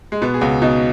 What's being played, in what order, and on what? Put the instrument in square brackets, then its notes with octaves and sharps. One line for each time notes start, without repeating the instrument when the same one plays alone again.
[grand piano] G#3
B2 B3
G#4
C#2 F#4
B2 D#4